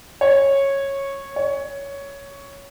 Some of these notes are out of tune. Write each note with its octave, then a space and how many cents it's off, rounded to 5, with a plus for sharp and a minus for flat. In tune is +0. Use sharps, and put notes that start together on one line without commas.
C#5 -10
C#5 +10